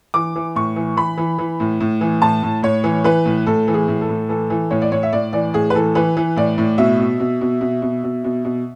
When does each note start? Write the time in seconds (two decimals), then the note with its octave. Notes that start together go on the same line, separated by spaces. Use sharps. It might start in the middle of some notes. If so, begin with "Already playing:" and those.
0.14 E3 D6
0.36 E3
0.56 A2 C#6
0.76 E3
0.97 E3 B5
1.18 E3
1.38 E3
1.60 A2
1.80 A2
2.01 E3
2.22 A2 A5
2.43 A2
2.63 A2 C#5
2.84 E3
3.04 E3 B4
3.25 A2
3.47 A2 A4
3.68 E3
3.74 G#4
3.88 A2
4.01 A4
4.09 A2
4.29 E3 A4
4.50 E3
4.71 A2 C#5
4.82 D5
4.92 A2 C#5
5.03 E5
5.13 A2 D5
5.33 E3 D5
5.54 A2 G#4
5.70 B4
5.75 E3 A4
5.95 E3 B4
6.17 E3
6.36 A2 D5
6.58 A2
6.78 B2 E5
7.00 B2
7.20 B2
7.41 B2
7.61 B2
7.82 B2
8.04 B2
8.24 B2
8.45 B2